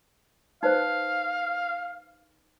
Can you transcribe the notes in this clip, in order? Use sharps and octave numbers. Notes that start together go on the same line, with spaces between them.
D#4 B4 C5 F5